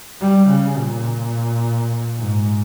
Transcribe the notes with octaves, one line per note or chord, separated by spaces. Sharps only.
G3
C#3
A#2
G#2